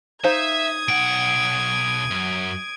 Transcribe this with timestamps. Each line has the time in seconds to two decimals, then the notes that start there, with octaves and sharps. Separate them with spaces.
0.24 D#4 C5 E5 F5 D#6 G#6
0.88 B1 F#5 D7
2.11 F#2